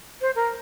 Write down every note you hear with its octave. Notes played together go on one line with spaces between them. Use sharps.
C5
A#4